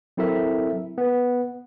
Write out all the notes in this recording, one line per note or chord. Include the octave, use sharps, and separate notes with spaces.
F#3 C4 E4 A4 A#4 E5
B3